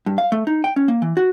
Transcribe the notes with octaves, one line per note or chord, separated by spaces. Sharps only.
G2
F5
A3
D#4
G5
C#4
A#3
E3
F#4